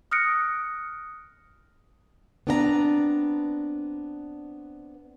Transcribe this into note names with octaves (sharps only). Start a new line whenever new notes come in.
D#6 F6 F#6 A#6 C#7 D7
B3 C4 D4 B4 E5 A#5